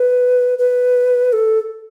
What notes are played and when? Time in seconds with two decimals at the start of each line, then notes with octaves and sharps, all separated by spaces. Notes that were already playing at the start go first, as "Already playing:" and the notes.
Already playing: B4
0.59 B4
1.33 A4